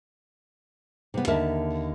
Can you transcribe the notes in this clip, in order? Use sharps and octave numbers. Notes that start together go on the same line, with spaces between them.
C3 B3
D#2 D3 A#4 E5 A5